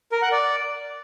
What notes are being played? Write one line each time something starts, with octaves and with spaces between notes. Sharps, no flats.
A#4
F#5
D5